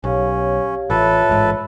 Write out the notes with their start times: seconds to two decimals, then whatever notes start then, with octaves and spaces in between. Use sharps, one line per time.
0.04 B1 C#4 G4 C#5 F5
0.90 A1 F4 A4 B4 C#5 E5
1.29 A1 G#2